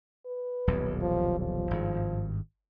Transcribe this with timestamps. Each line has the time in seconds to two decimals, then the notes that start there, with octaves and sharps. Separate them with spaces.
0.26 B4
0.67 D#1 B1 E2
1.02 F3
1.40 F3
1.71 G#1 G2